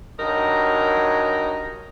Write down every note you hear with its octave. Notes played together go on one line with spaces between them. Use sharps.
G2 F#3 D#4 A#4 C#5